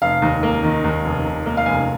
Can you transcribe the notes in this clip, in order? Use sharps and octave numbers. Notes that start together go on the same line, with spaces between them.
F1 F5
D#2
A#3
D#3
D#2
F1
F1
A#3
F5
F1 G#5